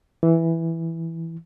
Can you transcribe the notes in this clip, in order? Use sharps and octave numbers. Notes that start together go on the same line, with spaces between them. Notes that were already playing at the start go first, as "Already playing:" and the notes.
E3